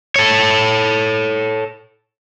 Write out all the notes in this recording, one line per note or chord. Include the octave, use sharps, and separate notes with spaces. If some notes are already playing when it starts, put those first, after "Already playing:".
A4 C#5